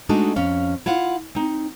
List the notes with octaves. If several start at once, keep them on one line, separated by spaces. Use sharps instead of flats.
G#3 A3 D4 D#4 F#4 A4
F2 C#4 F5
E4 F4 F5 F#5
C4 D#4